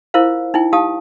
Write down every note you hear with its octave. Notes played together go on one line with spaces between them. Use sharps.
E4 F4 A#4 C5 F5
D#4 E4 G5
D#4 G4 F5 A5 D#6